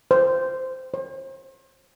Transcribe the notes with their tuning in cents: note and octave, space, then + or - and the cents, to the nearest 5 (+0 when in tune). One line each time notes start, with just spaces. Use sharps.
C5 -10
C5 +40